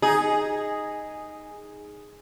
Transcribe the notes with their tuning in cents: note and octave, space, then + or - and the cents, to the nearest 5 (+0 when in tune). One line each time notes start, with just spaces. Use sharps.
D#4 +0 G#4 -5